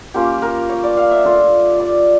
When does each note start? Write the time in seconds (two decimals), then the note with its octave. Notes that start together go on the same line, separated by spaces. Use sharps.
0.14 A#3 C#4 F4 G4
0.42 A#4
0.69 C#5
0.83 D5
0.97 F5
1.11 E5
1.25 A3 D4 F4
1.80 D5